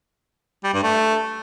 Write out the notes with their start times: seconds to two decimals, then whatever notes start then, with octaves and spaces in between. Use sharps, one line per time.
0.64 G3
0.74 G2
0.83 A3